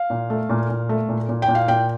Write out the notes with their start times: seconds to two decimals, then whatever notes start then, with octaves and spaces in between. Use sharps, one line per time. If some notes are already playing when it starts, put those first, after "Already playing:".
Already playing: F5
0.10 A#2
0.30 A3
0.50 A#2
0.69 A#2
0.89 A3
1.09 A#2
1.29 A#2
1.42 G5
1.48 A#2
1.55 F5
1.68 A#2 G5